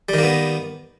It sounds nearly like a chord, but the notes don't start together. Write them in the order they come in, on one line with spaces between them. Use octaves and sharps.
G3 D#3 A#3 B3